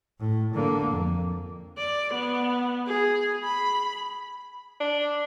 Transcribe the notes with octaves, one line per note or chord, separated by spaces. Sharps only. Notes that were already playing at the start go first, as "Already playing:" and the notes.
A2
D3 A#3
F2
D5
B3
G#4
B5
D4